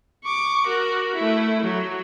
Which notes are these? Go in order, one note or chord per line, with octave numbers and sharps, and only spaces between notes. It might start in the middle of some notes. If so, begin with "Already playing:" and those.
C#6 D6
F#4 A#4
A3 E4
F#3